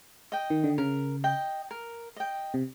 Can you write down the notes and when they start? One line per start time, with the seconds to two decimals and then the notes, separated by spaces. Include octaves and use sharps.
0.32 D#5 G5
0.50 D#3
0.64 D3
0.78 C#3 A#4
1.24 D#5 G5
1.71 A#4
2.16 D#5 G5
2.54 C3